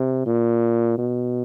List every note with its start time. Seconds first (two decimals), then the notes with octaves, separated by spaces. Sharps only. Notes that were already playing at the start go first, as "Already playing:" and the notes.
Already playing: C3
0.26 A#2
0.98 B2